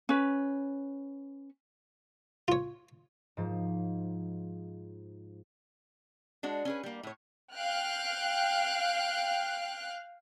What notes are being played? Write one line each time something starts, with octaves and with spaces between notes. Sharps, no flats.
C#4 B4
F4 C#5
G#2 F3
G#3 D4 F#4
C#4 G#4 B4
G3 A#3
A2 C#5
F5 G5 F6 F#6